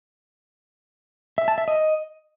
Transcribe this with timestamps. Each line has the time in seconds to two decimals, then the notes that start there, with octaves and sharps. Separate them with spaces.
1.38 E5
1.48 A5
1.58 E5
1.68 D#5